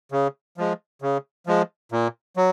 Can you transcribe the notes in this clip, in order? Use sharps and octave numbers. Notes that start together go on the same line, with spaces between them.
C#3
F3 G#3
C#3
F3 G#3
A#2
F#3